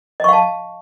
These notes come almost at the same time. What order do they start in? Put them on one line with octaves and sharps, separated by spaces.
D#5 C#6 F5 A5